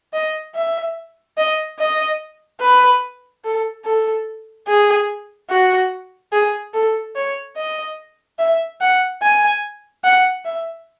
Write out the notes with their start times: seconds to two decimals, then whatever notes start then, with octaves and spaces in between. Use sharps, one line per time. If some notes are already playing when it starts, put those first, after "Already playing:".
0.13 D#5
0.55 E5
1.37 D#5
1.79 D#5
2.61 B4
3.44 A4
3.85 A4
4.67 G#4
5.50 F#4
6.32 G#4
6.73 A4
7.15 C#5
7.56 D#5
8.39 E5
8.81 F#5
9.22 G#5
10.04 F#5
10.45 E5